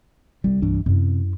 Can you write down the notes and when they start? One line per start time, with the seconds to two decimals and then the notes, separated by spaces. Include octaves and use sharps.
0.44 C2 G3
0.62 G2 E3 D4
0.86 F#2 C3 E4